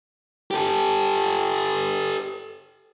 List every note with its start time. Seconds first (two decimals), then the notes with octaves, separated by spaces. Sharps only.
0.51 G4 A4